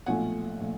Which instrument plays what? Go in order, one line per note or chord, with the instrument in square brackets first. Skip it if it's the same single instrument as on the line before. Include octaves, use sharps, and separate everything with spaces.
[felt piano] B1 A#2 F3 A3 F#5 G#5
A#2 F3 A3